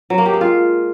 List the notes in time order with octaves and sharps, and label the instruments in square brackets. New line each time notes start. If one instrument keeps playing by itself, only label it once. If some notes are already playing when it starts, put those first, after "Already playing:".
[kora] F#3
A#3
G4
G#3
F4